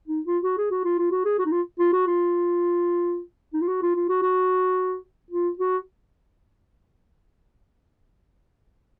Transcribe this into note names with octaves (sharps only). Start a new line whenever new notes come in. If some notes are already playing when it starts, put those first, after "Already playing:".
D#4
F4
F#4
G#4
F#4
F4
F4
F#4
G#4
F#4
D#4
F4
F4
F#4
F4
D#4
F4
F#4
F4
F4
F#4
F#4
F4
F#4